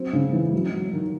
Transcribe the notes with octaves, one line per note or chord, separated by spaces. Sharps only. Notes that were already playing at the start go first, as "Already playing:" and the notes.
Already playing: F#3 C4
C#3
E3
F#3
F#3
D#3